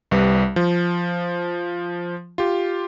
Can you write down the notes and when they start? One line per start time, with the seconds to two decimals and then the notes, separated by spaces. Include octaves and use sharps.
0.11 C2 G3 B4
0.56 F3
2.38 F4 G4